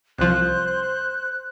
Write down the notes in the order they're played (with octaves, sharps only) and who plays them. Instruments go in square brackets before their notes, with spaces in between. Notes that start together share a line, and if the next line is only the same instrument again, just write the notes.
[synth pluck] C2 F3 [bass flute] C5 [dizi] F#6